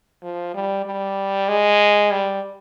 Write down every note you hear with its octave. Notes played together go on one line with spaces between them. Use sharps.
F3
G3
G3
G#3
G3